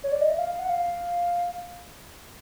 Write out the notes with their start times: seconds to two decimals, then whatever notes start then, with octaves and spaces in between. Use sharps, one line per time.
0.04 C#5
0.12 D5
0.21 D#5
0.30 E5
0.39 F5
0.59 F#5
0.70 F5